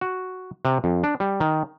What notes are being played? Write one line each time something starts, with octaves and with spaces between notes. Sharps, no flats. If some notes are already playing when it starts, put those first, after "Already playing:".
F#4
C3
F2
D4
G3
D#3